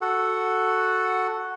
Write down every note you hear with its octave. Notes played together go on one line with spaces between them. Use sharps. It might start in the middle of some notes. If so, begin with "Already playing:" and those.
F#4 A4 F#5